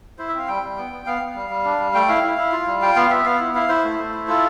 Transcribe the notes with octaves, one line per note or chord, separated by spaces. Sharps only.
E4 C5
E5
C4 F5
G3 G5
G3
B3
B3
B3 F5
B3
G3
G3
D4
G3
A3 G5
E4 F5
E4
E4
F4
G3
F4 G5
B3 F5
B3 E5
B3 F5
E4
E4 F5
E4 C5
A3
A3
E4
F4 A4